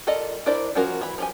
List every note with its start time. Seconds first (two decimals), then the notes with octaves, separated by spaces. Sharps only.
0.07 F4 A4 A#4 D5 D#5
0.46 D4 E4 A#4 C5 D5
0.75 F3 C#4 F4 F#4 A#4
1.01 E3 B5
1.18 F3 G4 G#5